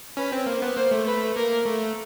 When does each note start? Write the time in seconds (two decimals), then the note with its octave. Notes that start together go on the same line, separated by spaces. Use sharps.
0.17 C#4 B4
0.32 C4
0.46 A#3 C5
0.62 B3
0.77 A#3 C5
0.91 A3
1.07 B4
1.36 A#3 A#4
1.66 A3